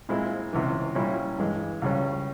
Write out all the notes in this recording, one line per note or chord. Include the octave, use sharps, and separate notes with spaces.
A#2 G#3 C4 E4
C#2 C3 E3
A#2 G3 C#4 E4
G2 E3 G#3
C#2 C#3 G3 C#4